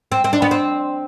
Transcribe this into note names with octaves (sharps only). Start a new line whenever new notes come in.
C4
C4
D4
B3
C4